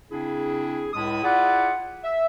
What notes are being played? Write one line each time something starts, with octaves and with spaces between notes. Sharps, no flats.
C#3 C4 D4 E4 G#4
C#2 A2 G#3 E4 A5 D#6
E4 F4 G#4 D5 F#5
E5